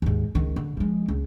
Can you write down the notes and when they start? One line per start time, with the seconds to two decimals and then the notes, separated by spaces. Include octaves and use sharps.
0.02 D#2 G#2
0.35 C#2 D#3
0.56 D3
0.77 F3 G#3
1.08 C#2